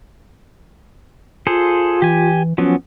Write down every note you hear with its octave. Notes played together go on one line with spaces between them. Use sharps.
F4 G#4 A4 C5
E3 G4 G#5
F3 F#3 B3 C#4